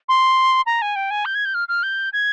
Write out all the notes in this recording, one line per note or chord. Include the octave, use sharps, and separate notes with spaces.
C6
A#5
G#5
G5
G#5
G6
G#6
G6
F6
F6
G6
G#6